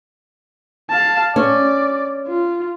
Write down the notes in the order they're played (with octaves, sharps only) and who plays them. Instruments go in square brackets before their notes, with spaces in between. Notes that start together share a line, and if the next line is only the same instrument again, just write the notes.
[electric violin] F5 A5
[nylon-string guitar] C#4 [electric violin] D5
[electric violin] F4